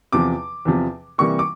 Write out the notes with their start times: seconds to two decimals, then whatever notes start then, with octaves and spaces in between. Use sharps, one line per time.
0.12 E2 C3 F3 D6
0.65 E2 C3 F3
1.18 C3 E3 G3 A#3 C#6
1.39 D6